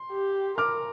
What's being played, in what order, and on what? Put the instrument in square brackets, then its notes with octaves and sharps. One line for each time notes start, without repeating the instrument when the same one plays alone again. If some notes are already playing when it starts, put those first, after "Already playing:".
Already playing: [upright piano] C6
[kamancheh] G4
[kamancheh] A#4 [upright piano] D6 F6